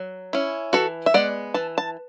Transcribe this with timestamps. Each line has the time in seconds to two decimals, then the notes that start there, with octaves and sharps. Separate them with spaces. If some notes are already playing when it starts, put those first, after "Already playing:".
Already playing: F#3
0.33 C#4 E4
0.73 E3 F#4 A4
1.06 E5
1.14 G#3 B3 D5 F#5
1.54 E3 A5
1.78 A5